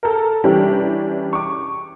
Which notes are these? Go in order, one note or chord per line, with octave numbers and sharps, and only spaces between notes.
A4 A#4
E3 G3 C#4 D4 G4
C#6 D6